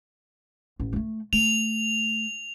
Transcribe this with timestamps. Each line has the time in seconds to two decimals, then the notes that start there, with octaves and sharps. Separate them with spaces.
0.80 A1
0.93 A3 A#3
1.33 A3 F7